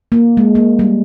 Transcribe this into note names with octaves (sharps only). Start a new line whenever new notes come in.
A#3
G#3
A#3
G3